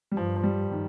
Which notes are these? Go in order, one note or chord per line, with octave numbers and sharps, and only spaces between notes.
G3
G2 F3
F3
G3
D#3